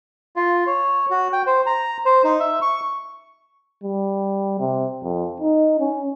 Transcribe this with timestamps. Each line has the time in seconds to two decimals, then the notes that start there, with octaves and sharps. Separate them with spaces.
0.36 F4
0.67 C#5
1.11 F#4
1.33 G5
1.47 C5
1.66 A#5
2.05 C5
2.24 D#4
2.40 E5
2.62 C#6
3.84 G3
4.60 C3
5.03 F2
5.41 D#4
5.80 C#4